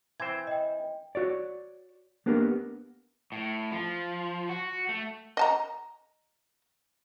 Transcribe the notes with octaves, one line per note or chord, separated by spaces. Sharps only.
E3 C4 C5 G#6
D#5 G5
F#4 C#5 D5
A#3 B3 D4 G4 A#4
A2
F3
F#4
A3
D#5 A5 A#5